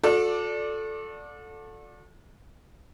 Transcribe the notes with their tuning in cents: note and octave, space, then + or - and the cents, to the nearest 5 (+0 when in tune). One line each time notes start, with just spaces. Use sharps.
F#4 -40 A4 +0 D5 +0